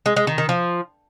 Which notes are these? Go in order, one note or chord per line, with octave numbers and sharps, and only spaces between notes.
G#3
G#3
D#3
D#3
F3